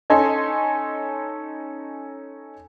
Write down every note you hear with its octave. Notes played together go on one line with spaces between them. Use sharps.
C#4 D#4 A4 D#5 G#5 C6